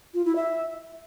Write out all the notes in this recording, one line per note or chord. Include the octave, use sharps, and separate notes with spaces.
F4
E4
E5